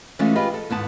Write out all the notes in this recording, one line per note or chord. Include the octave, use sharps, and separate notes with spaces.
E3 G#3 A3 C#4 F4
F4 G4 G#4 B4 D#5 F5
A4
D#2 G#2 B3 A5